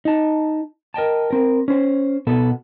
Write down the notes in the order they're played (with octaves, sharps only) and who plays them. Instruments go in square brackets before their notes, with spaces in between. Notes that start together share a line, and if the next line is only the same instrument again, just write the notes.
[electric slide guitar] D#4 A5
A#4 D#5 G5 A5
C4 A#4
C#4 C5
B2 B3 A4